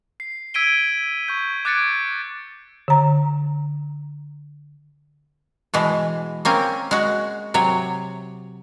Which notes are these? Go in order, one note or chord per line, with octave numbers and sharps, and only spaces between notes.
C7
E6 G#6 B6 D7 D#7 G7
C#6 G6
D6 F#6 G#6 A6 C#7 D7
D3 A#5
B2 E3 G#3
A#3 C4 C#4
G#3 F#4
C3 F#3 C#5